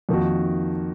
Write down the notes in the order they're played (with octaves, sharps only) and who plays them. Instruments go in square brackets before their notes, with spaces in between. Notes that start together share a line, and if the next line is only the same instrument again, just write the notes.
[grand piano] F2 D#3 A#3 D#4 F#4